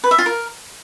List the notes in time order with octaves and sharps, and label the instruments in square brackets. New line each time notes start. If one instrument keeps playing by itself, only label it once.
[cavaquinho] B4
E5
F4
A#4